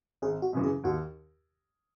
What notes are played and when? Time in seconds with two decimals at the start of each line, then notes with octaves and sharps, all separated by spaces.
0.22 G#1 G#4
0.42 F#4
0.53 F#2 C#3 E3
0.63 G#4
0.84 D#2 F#4